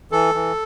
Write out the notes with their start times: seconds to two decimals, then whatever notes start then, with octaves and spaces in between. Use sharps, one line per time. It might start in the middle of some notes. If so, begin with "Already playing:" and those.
0.12 E3 A4
0.35 E3